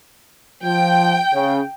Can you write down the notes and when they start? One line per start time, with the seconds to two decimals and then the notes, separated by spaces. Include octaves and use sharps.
0.63 F3 G5
1.33 C#3